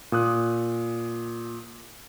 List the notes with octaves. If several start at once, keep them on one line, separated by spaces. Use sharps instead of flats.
A#2 D#6 F#6